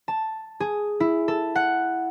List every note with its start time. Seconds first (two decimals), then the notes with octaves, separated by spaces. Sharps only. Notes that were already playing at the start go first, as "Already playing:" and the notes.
0.08 A5
0.60 G#4
1.00 E4
1.28 A4
1.55 F#5